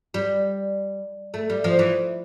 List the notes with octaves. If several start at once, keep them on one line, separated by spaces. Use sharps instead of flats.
G3
A3
G3
F3
E3